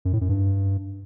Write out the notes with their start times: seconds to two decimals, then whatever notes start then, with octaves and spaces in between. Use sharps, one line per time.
0.05 F#2
0.13 A2
0.21 F#2
0.29 G2